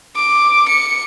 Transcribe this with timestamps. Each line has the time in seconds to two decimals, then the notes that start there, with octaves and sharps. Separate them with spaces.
0.16 D6
0.68 C#7